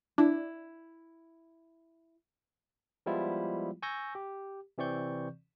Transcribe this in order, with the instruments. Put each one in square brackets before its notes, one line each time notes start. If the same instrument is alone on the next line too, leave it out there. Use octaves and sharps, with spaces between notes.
[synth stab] D4 [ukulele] E4
[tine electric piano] F3 G3 G#3 B3 E4 F4
G#5 C#6 E6 G6 A#6
G4
C3 E3 C4 D5 C#6 G6